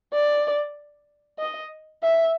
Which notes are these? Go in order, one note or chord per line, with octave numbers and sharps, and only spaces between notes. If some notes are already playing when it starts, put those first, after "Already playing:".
D5
D#5
E5